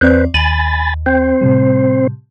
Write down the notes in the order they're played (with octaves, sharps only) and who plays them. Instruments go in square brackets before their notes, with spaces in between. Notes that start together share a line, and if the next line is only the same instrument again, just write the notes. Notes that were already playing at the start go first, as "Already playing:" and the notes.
[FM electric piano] E2 C4 D5 [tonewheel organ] B4 C5
[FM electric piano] D#2 [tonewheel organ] G#5 B5 A6
[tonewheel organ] C4 C5
[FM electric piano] A2 C3 G3